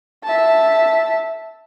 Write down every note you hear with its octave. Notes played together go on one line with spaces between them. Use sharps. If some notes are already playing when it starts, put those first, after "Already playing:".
E5 A5